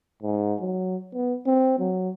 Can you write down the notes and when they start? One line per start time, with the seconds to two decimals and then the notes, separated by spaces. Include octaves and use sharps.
0.22 G#2
0.61 F#3
1.13 B3
1.46 C4
1.79 F#3